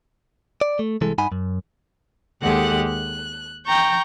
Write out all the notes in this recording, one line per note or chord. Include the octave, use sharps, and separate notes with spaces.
D5
A3
C2 E3 G#3 A4
G2 D#4 F#5 G#5 B5
F#2
D#2 G#3 G4 A4 F#5 F#6
F#6
G5 A#5 C#6 G6